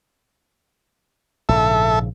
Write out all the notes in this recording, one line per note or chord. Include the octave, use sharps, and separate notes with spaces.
A#1 G#2 C#3 A4 E5